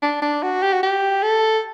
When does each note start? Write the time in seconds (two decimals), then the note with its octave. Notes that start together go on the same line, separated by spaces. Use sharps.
0.02 D4
0.22 D4
0.43 F#4
0.62 G4
0.73 F#4
0.83 G4
1.23 A4